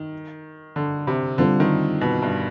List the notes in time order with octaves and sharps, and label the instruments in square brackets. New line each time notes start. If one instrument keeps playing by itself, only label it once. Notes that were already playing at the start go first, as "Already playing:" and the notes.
Already playing: [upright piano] D#3
D3
C3
[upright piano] D3 [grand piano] G3 C4 F4
[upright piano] D#3
B2
G2